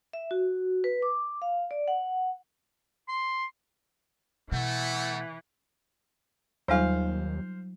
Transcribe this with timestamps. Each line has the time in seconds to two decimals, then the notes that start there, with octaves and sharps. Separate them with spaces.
0.13 E5
0.31 F#4
0.84 B4
1.02 D6
1.42 F5
1.71 D5
1.88 F#5
3.08 C6
4.52 B2 E3 A3 F#5
6.68 D#2 F#3 G3 D#4 F4 C5 F5 G#5